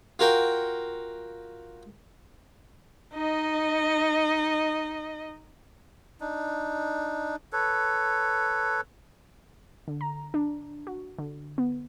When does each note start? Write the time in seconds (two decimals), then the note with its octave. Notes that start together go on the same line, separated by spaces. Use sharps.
0.19 F4 F#4 A#4 G5 C#6
3.14 D#4 D#5
6.21 D4 D#4
7.53 A4 B4 C#5
9.88 D3
10.01 A#5
10.34 D4
10.87 F#4
11.19 D3
11.58 B3